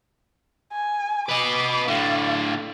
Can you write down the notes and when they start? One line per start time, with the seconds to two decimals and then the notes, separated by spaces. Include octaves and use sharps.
0.72 G#5
1.29 B4 D#5 D6
1.88 A2 D3 F5